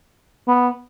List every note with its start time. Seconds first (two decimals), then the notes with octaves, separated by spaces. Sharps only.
0.48 B3